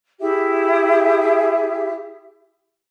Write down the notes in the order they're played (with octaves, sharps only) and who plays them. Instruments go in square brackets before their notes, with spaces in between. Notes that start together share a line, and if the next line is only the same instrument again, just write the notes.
[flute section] E4 G4 G#4 E5